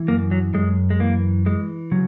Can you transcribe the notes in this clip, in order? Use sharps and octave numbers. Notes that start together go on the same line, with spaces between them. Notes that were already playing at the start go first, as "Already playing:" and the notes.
Already playing: E3
F#2 A#3
F#3
F#2 G#3
G#3
E3 A#3
E3 G#3
C#3 F#3